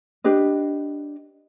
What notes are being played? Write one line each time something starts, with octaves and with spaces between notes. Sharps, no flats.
D4 G4 B4 D#5